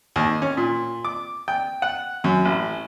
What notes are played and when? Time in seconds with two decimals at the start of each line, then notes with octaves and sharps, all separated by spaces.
0.16 D#2
0.42 C#4
0.57 A#2
1.05 D6
1.48 G5
1.82 F#5
2.24 F#2
2.45 A1